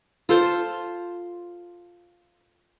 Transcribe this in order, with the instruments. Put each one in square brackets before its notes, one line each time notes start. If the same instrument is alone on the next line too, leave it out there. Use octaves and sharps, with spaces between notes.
[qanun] F4 A4 C5